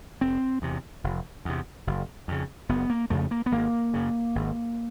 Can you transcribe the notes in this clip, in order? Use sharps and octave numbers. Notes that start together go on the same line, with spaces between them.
F1 C4
E2 C3
F1
E2 C3
F#1
F2 C#3
F#1 B3
A#3
F2 C#3 A3
A#3
B3
G#1 A#3
F#2 C#3
G#1